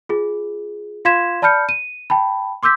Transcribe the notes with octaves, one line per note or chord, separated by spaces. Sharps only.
F4 G#4
F4 F5 C6 G#6 B6 E7
D5 A5 B5 F6 G6 C#7
D#7
G5 A5 B5
C6 D6 E6 G6 B6